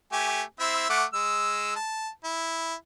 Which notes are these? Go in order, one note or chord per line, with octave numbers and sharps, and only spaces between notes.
A3 G4 G#5
C4 E4 E5
A3 F#5 D6
G#3 E6
A5
E4